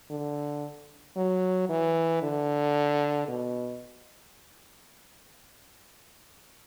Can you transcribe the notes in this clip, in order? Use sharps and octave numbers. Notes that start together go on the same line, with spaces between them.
D3
F#3
E3
D3
B2